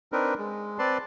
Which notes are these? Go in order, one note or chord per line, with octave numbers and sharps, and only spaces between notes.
C4 D4 D#4 A#4 B4
G#3
C4 B4 D5 A5 C6